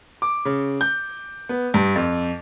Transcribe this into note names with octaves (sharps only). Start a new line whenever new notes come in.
D6
C#3
G6
B3
G2
F2